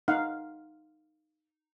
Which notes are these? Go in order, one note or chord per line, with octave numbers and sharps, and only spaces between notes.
D#4 F5 F#5